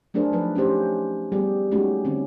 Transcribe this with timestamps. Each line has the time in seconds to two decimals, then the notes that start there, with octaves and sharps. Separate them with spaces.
0.14 F#3 A3 D4 G#4 A#4 C5
0.32 F3 F#3 A3 D#4 B4
0.55 A3 C#4 D#4 G4 C5
1.32 G3 B3 G4 G#4
1.72 G#3 A3 C#4 D#4 F#4 G4
2.05 D3 C4 C#4